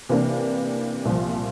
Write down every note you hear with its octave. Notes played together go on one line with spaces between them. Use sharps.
C3 E3 A#3 D4
C2 A#2 F3